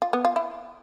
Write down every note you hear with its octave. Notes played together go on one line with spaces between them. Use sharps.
F4
B3
F4
E4